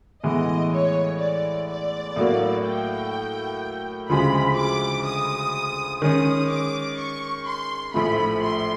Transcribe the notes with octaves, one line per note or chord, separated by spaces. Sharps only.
A2 E3 G#3 B3 D#5
C#5
D5
D5
A2 F#3 A#3
G5
D2 C#3 F3 G#3 B5
D6
D#6
D#3 G#3 C#4 D#6
D6
C#6
C6
A#1 A2 F3 A3 B5
C6